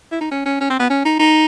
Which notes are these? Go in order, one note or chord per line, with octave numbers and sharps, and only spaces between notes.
E4
D#4
C#4
C#4
C#4
C4
B3
C#4
D#4
D#4